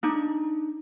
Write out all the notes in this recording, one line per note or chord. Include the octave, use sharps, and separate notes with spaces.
D4 D#4